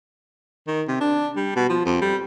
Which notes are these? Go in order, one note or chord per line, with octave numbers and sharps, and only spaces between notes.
D#3
C3
D4
G3
B2
F3
F2
G3